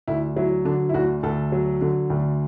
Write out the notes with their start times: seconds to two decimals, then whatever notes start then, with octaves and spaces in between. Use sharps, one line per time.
0.08 D2 E4
0.36 F#3 E4
0.65 D3 D4
0.89 E4
0.94 D2 F#4
1.23 D2 A4
1.52 F#3
1.82 D3
2.10 D2